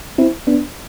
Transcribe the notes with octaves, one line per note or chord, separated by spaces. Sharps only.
C4 E4
B3 D4